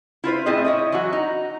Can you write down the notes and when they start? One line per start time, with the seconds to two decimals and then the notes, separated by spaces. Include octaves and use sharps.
0.24 E4 F4 B4 C5
0.46 A2 A3 C4 E4 G#4 D#5
0.65 E4 C#5 D#5
0.92 E3 F#3 F#4
1.13 D#4